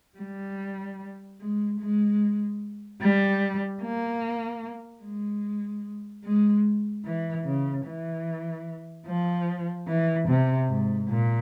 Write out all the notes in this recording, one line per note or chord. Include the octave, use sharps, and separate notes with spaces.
G3
G#3
G#3
G3
A#3
G#3
G#3
E3
C#3
E3
F3
E3
C3
G#2
A#2